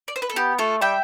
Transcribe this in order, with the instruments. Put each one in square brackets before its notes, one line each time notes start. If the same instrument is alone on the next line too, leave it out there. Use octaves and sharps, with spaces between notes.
[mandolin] D5
C5
B4
A4
[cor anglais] B3 [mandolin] G4
[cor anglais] A3 [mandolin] F4 A4
[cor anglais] G3 [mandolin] E5 G5